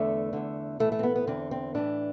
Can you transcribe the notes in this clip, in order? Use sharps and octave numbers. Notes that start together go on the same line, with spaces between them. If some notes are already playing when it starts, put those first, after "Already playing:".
Already playing: E2 D3 A3
E2 D3
A2 E3 A3
A3
C4
B3
B3
E2 D3 C4
C4
A2 E3 D4